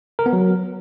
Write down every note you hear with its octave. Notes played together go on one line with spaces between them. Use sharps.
A#4
B3
F#3